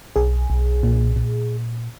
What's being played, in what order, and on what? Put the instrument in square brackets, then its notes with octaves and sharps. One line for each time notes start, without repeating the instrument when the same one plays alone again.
[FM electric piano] B1 G#4
B1
A#2
A#2